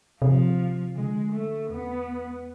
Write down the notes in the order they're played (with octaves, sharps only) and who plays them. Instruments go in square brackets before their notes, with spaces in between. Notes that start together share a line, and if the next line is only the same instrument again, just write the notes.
[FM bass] C3 [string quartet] F3
[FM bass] D3 [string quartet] G#3
[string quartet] A3
[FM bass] E2 [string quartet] B3